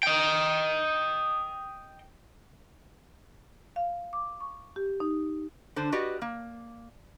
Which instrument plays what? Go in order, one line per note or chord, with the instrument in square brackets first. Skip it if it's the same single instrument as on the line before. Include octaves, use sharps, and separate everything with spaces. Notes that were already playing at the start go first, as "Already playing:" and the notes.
[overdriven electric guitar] D#5 G5
[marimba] F5
D6
C#6
G4
D#4
[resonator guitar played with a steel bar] D3 D4 C5
F#4 G4 B4 D5 D#5
A#3